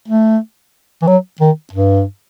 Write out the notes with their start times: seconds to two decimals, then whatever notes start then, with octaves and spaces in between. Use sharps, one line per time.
0.08 A3
1.02 E3
1.07 F#3
1.40 D#3
1.73 G2